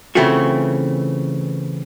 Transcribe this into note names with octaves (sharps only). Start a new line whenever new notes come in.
C#3 E3 A3 C4 F4 F#4